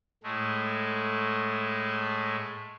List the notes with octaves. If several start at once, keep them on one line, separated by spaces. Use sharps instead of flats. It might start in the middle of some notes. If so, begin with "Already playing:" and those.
A2 G#3 A3